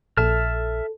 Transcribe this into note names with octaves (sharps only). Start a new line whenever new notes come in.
A#1 A4 E5 A5 F6